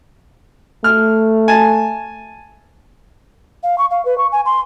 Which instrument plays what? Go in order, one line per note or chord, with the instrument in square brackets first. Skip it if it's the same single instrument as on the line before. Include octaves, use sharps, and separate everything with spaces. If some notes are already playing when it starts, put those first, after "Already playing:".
[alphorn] A3 [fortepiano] F6
[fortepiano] G#5 A5
[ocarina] F5
C#6
F5
B4
C#6
G#5
C6